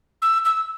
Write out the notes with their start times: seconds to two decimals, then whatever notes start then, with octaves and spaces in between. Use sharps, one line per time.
0.22 E6
0.45 E6